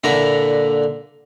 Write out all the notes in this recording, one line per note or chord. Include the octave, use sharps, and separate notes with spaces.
A#2 D3 E4 A#5